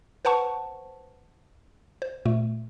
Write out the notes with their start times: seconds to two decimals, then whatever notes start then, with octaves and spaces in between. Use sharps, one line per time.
0.25 B4 C5 F#5 A5 C#6
2.02 C5
2.25 A#2 A3